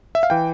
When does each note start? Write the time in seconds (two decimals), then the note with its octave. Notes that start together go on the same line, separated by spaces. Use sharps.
0.15 E5
0.23 F5
0.30 E3 G5